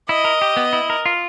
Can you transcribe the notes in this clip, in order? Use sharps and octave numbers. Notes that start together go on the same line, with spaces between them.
E4 D#5
A#4
G4
B3
E4
A#4
F4